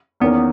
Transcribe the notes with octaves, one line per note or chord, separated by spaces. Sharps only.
E2 D#3 A#3 B3 C#4